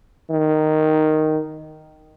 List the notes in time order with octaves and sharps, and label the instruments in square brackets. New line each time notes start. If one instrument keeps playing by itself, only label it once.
[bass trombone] D#3